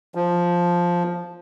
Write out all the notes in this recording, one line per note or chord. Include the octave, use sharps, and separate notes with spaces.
F3